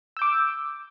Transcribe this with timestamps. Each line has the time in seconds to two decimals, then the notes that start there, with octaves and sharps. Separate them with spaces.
0.17 E6
0.19 G6
0.22 D6